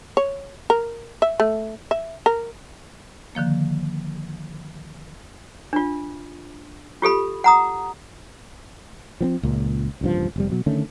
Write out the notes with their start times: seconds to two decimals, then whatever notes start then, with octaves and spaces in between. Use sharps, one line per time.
0.17 C#5
0.70 A#4
1.22 E5
1.40 A3
1.91 E5
2.26 A#4
3.35 D3 D#3 F3 A#3
5.73 D4 F4
7.02 F4 G4 A4 B5
7.44 F#5 A#5 D#6
9.21 F3 B3 C4
9.43 C#2 A#2
10.01 D1 C#2 G2 F3
10.36 F1 C3 G3
10.51 B2 F#3
10.66 D3 D#3 A3 C#4